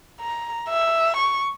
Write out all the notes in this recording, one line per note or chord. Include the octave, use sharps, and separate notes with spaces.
A#5
E5
C#6